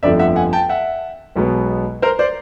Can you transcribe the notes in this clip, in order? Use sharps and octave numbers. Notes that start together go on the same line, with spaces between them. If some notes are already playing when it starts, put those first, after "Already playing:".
G1 F2 D3 F3 A3 D5 E5
E5 F#5
F#5 G#5
G5 A5
E5 F#5
B1 B2 G#3 B3
A#4 C5
C5 D5